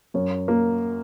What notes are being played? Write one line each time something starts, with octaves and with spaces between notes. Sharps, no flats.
F#2 C#5
A#3